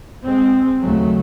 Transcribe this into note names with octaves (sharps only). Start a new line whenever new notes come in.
G#3 C4
D#2 C#3 F#3 A3